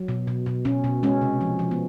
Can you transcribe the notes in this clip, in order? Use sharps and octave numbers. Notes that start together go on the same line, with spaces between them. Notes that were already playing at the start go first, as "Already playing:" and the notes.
Already playing: F#3
B2
B2
B2
B2 C#4
B2
G#3 C#4
C3
F3
F3
B3